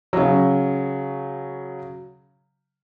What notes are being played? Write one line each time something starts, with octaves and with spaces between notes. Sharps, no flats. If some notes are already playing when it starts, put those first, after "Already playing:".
C#3 F#3